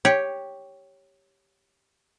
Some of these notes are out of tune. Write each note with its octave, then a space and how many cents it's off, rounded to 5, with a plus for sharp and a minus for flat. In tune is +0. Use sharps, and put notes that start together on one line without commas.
G4 +0 C#5 +0